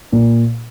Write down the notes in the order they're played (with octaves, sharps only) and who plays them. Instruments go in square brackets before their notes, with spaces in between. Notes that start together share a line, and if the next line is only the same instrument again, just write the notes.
[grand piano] A#2